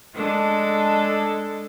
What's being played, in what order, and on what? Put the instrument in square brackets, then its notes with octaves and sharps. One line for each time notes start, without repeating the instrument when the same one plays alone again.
[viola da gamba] G#3 D4 A4